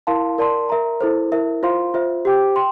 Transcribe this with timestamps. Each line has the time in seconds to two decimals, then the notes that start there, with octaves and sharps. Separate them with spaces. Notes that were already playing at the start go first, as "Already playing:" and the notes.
0.07 E4 A#4 F5 A5 C6
0.38 A#4 D5 A5 C6
0.69 A#4 E5 A#5
1.01 E4 A4 C5
1.32 E4 A#4 E5
1.63 F4 C5 F5 C6
1.94 F4 C5 E5
2.25 G4 C5 G5 D6
2.56 G5 C6